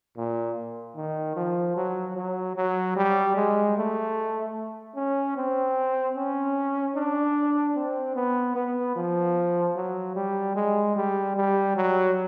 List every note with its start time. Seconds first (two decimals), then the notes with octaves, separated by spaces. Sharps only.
0.17 A#2
0.96 D#3
1.36 F3
1.77 F#3
2.17 F#3
2.56 F#3
2.96 G3
3.36 G#3
3.77 A3
4.96 C#4
5.37 C4
6.16 C#4
6.96 D4
7.76 C4
8.16 B3
8.56 B3
8.96 F3
9.76 F#3
10.16 G3
10.56 G#3
10.96 G3
11.37 G3
11.76 F#3